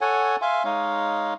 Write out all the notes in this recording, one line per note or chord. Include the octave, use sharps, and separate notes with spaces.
A4 C#5 F#5 G#5
E5 F5 G#5 C6
G#3 D#4 C#5 F5